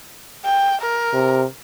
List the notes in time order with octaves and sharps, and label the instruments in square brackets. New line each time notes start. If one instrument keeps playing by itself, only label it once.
[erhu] G5
A#4
[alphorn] C3